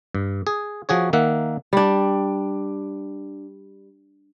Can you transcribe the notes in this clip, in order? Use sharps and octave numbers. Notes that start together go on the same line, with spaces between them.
G2
G#4
F3 F#4 G#4 C#5
D#3 A#3 E5 F#5
G3 D4